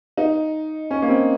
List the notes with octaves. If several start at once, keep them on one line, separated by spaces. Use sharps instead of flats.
D#4
C#4
A#3
C4